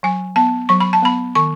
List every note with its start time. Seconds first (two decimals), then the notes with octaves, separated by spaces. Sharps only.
0.03 F#3 G#5
0.36 B3 A5
0.69 F#3 C#6
0.80 B5
0.93 A5
1.03 B3 B5
1.35 D#3 C#6